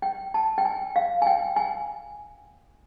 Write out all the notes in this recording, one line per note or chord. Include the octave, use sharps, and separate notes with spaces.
G5
A5
G5
G#5
F5
G#5
G5
G#5